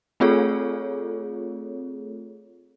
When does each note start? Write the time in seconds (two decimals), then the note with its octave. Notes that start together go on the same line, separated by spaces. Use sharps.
0.20 A3 C4 F4 G#4 A4 C#5